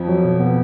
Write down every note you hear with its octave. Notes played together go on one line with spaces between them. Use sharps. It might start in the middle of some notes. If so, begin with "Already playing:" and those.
Already playing: F2 F3
F#3
B2
B3